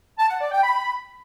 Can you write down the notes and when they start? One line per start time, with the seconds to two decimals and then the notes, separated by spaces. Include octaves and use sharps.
0.18 A5
0.29 F#5
0.41 D5
0.52 G5
0.63 B5